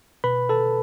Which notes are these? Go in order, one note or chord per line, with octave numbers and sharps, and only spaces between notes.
B2 B4 B5
A4 A5